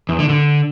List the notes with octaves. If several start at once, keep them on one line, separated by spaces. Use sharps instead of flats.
E2
D3
D3